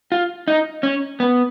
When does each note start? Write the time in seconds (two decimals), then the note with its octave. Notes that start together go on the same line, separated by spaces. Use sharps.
0.12 F4
0.48 D#4
0.83 C#4
1.20 B3